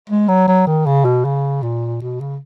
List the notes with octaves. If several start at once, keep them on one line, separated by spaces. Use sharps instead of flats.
G#3
F#3
F#3
D#3
C#3
B2
C#3
A#2
B2
C#3